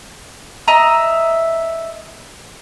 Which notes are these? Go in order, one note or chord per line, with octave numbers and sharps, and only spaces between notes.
D#5 E5 A#5